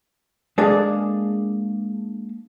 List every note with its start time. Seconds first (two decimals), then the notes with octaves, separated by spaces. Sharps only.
0.58 G#3 A#3 D4 G#4 A4 F5